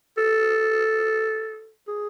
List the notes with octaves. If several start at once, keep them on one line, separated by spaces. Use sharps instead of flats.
A4
G#4